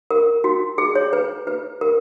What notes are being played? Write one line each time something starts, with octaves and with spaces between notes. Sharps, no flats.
A#4
F#4
G#4
C#5
B4
B4
A#4